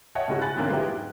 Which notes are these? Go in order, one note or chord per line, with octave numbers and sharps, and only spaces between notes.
C#5 D#5 E5 F#5 G5 A5
G#2 C#3 G#3 E4 F#4
G#5 B5 F#6 A6
E2 A#2 D3 A#3 C4 C#4
F#3 G#3 B3 E4 F4 G4
G#2